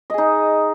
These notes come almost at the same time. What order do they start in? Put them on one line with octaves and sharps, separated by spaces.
D#5 G#4 D#4